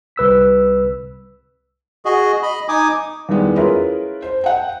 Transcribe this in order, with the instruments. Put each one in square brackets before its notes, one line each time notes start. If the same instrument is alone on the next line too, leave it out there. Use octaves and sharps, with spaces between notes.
[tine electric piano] C2 B4 E6 B6
[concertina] F#4 G#4 D#5
D#5 B5
D#4 G#5 D6 D#6
[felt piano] E2 D#3 G3 G#3 B3
C#4 E4 F4 G#4 A#4 B4
C5
F#5 G5